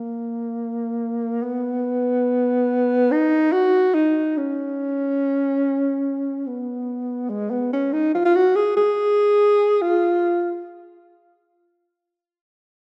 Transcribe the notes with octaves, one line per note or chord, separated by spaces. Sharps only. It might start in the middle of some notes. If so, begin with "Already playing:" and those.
Already playing: A#3
B3
D#4
F#4
D#4
C#4
B3
G#3
B3
C#4
D#4
F4
F4
F#4
G#4
G#4
F4